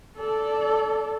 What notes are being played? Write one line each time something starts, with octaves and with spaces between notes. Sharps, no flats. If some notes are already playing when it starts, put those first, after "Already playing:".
A4 D5